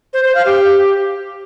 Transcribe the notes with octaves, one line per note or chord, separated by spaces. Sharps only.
C5
C5
F5
G4